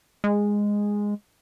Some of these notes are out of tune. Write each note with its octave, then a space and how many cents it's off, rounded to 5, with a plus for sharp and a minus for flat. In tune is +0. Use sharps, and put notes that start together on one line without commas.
G#3 -10